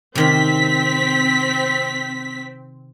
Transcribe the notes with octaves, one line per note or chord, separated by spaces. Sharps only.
C3 D#3 C4 C#4 B6